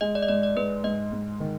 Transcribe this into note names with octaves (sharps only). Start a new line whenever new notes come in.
G#3 D#5
D5
D#5
G#2 D5
D5
G#2 B4
G#2 D#5
G#2
D#3